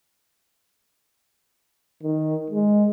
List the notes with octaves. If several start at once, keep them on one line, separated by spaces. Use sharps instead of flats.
D#3
G#3